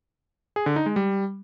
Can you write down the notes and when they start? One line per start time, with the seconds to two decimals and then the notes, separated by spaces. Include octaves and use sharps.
0.56 G#4
0.66 D3
0.76 D#4
0.86 G#3
0.96 G3